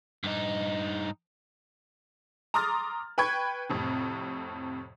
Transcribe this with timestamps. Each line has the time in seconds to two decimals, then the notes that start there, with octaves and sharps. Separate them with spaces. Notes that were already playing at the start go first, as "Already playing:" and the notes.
0.24 G2 D#4
2.54 A#5 C6 D6 D#6 F6 A6
3.18 B4 G5 B5 C#6 G#6
3.69 F2 A2 C3